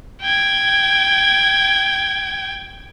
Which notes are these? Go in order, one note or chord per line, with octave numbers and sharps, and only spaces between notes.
G5 G#6